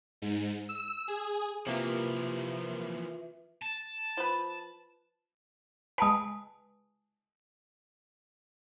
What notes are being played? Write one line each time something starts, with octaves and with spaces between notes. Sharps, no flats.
G#2
E6
G#4
C3 E3 F3 A#3 F4 B4 E5
A5
F3 B4
G#3 B4 G#5 A5 D#6